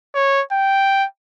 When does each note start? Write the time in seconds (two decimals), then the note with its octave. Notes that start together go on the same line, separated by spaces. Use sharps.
0.15 C#5
0.52 G5